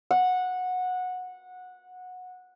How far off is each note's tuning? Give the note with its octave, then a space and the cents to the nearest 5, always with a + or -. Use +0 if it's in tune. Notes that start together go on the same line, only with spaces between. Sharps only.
F#5 -15